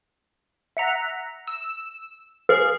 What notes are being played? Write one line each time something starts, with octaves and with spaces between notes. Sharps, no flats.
E5 F#5 A#5
E6
G#4 B4 F5